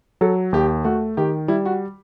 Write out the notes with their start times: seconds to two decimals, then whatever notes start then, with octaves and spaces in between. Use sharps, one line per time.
0.21 F#3 A4
0.53 D#2 G4
0.84 A3 F#4
1.17 D#3 G4
1.48 G3 E4
1.65 F#4